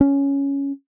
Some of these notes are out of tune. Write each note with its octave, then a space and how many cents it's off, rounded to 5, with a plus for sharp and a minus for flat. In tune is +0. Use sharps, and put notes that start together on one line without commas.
C#4 +5